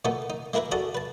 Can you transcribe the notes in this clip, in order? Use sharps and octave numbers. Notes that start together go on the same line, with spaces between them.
A#2 A3 B3 D#4 A4
D#4
G#3 A#3 E4 A#4 B4 E5
D4 F#4 G#4 A4 F#5 A5
B4 A5